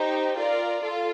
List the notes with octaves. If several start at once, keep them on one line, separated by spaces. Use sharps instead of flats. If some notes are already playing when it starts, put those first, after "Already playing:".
Already playing: D#4 G4 C5 G5
F4 A#4 D5
F4 A4